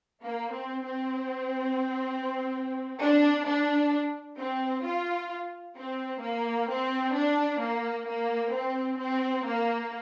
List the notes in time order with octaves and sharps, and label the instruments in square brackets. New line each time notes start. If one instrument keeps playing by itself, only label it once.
[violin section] A#3
C4
C4
D4
D4
C4
F4
C4
A#3
C4
D4
A#3
A#3
C4
C4
A#3